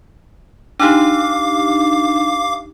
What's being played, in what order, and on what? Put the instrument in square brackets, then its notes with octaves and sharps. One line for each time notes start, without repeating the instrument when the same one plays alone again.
[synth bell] D4 D#4 G4 [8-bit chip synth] F5 D6